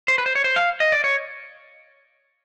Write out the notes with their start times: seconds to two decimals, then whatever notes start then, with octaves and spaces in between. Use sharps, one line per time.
0.08 C5
0.18 B4
0.26 C5
0.35 C#5
0.44 C5
0.56 F5
0.80 D#5
0.92 D5
1.04 C#5